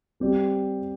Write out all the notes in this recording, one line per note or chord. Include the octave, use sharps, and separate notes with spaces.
G3 C4 G4 D5